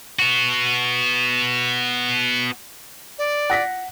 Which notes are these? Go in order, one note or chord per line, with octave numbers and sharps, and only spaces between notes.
B3 F#4
D5
F#5 A#6 B6